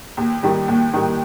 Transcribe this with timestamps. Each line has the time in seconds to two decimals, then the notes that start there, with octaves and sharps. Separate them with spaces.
0.17 D#2
0.43 D#3 G3
0.68 D#2
0.93 D#3 G3